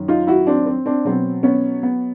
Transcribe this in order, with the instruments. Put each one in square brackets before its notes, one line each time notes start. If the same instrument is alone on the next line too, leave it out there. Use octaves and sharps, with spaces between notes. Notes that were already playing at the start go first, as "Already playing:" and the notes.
Already playing: [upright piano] F#2 D#3
D#4 F4
E4 F#4
C4 D4
C4
C4 D4
B2 F#3 B3 C4
B3 C#4
B3